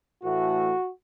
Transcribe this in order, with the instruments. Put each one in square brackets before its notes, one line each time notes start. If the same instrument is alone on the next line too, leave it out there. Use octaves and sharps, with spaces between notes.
[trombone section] A2 E3 A3 F#4